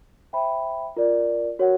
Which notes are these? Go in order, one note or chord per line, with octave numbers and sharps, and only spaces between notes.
C5 E5 G5 B5
F4 A#4 D5
F#4 A#4 C#5 F#5